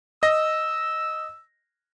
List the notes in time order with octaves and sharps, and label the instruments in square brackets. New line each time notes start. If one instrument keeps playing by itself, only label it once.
[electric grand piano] D#5 A#6 [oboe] E6